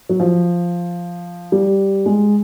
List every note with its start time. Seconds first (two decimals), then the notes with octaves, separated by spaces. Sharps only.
0.09 F#3
0.20 F3
1.52 G3
2.06 G#3